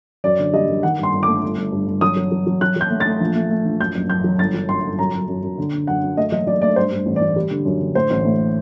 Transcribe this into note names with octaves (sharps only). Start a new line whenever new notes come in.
F#2 D5
D3
G3 D#5
F#2
D#3 F#5
G2
C6
G1
A3 D6
G1
G1
G2
G1
F#3 D#6
F#3
F#3
F#3
F#3 F#6
F#3 G6
A3
A6
A3
A#1
A3
A3
A#1
F#2 G6
F#1
F#1 G6
F#3
G1 A6
F#3
F#2 C6
G1
F#2 A#5
F#2
F#2
F#2
D3
D3
F#2 F#5
F#2
A3 D#5
F#3 D#5
F#3 D5
A3 D5
G2 C5
G2
A1
D5
A1
G3
D3
F#2
D3
A2 C5
A1
A2